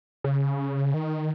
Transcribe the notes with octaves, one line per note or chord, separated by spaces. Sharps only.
C#3
D#3